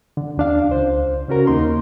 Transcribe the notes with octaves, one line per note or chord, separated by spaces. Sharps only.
D3
D#2 D4 F5
C#2 C5
C#3 C#4 F#4 A#4
D#2 A#3 D#4 C6